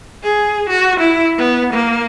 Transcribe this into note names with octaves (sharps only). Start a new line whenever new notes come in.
G#4
F#4
E4
B3
A#3